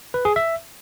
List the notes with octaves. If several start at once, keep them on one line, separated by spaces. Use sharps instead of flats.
B4
G#4
E5